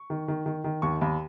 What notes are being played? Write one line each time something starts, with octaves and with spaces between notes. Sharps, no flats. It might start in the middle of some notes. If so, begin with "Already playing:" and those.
Already playing: C#6
D#3
D#3
D#3
D#3
D#2 C#6
D#2 B5